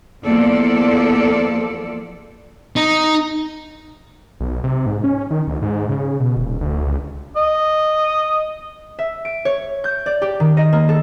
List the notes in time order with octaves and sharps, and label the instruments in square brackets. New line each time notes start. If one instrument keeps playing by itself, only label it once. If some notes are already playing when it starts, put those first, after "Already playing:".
[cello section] E2 F3 A#3 A4 D5
[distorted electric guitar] D#4
[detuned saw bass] B1
C3
G#2
C#4
D#3
D2
G#2
C#3
B2
D#1
D2
C#2
[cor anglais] D#5
[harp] E5
D7
C#5
G6
D5
G4
D#3
D#5
A#3
A4